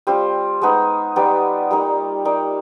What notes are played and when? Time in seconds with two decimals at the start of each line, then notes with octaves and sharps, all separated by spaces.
0.07 G3 C4 F4 C5
0.62 G#3 B3 D#4
1.16 G3 B3 D#4 D5
1.71 G3 A#3 D#4
2.25 A#3 D#4 D5